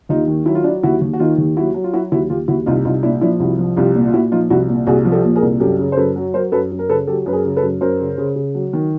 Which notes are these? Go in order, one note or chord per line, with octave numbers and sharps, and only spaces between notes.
D#2 D#4 F4
D#3
F#3 E4
F4
F#3 D4 E4
D#2 E4 F#4
D#2
F#4
D#3 D#4 F4
D#2
F#3 E4 F#4
F#3
F4
F#3 E4 F#4
D#2 E4 F#4
D#2 F4 G4
D#2 E4 F#4
C2 D#4 F4
C2 D#4 F4
A#2 D4 E4
F3 D4 E4
C2 E4 F#4
F3
C2 F4 G4
A#2
F4
A#2 E4 F#4
F3 D#4 F4
C2 E4 F#4
A#2
C2 F#4 G#4
F3
G4 A4
A#2
G#4 A#4
C2
F#2 G4 A4
C#3
C5
F#2 A4 B4
F#3
F#3 A#4 C5
F#2 A4 B4
F#2
A#4
C#3 A4 B4
F#3 G4 A4
F#2 B4
G#4 A#4
C#3
A4 B4
F#2
F#2 A#4 C5
C#3
C#3
C#3
F#3
D#3